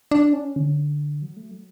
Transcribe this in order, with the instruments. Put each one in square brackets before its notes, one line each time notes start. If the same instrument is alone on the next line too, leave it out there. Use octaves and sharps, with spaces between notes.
[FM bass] D4
C#4
D3
F#3
A3
F#3